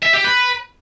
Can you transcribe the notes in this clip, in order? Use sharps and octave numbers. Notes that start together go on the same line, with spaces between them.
E5
G4
B4